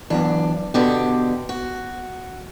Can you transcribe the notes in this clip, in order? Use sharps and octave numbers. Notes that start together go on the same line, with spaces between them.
E3 F#3 B3 D4
B2 D3 B3 G4
F#4